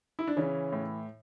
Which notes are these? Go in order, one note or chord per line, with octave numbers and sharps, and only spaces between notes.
E4
D4
C#3 E3 C#4
A2